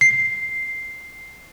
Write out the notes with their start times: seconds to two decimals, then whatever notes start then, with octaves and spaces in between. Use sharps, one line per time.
0.01 C7